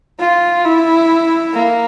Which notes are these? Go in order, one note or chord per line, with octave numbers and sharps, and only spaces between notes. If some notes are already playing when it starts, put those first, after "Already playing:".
F4
E4
A#3